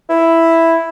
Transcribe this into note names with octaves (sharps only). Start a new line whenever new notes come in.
E4